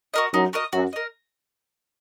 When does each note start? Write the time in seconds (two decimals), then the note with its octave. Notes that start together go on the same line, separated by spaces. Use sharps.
0.14 F#4 A#4 D#5
0.34 F#2 D#4
0.53 F#4 A#4 D#5
0.73 F#2 F#4
0.93 A#4 D#5